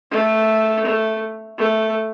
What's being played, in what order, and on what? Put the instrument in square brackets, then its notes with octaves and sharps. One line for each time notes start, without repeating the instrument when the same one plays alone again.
[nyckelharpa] A3
A3
A3